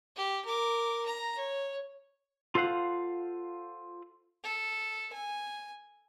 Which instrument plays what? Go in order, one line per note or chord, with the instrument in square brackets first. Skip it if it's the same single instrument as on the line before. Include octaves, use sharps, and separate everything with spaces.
[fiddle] G4
A#4 D6
A#5
C#5
[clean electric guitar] F4 A4 C5 F5 F#5
[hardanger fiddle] A4
G#5